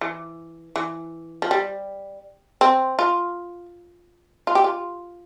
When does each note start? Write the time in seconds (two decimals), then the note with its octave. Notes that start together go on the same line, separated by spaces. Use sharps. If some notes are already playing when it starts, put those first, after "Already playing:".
0.01 E3
0.76 E3
1.42 F3
1.51 G3
2.61 C4
2.99 F4
4.47 F4
4.55 G4
4.64 F4